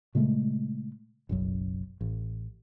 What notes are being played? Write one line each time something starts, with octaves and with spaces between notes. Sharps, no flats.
A#2 C#3 G#3 A3
F#1 B1 F#2
A1